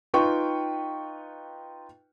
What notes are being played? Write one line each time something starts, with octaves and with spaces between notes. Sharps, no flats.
D#4 F4 B4 G5 C#6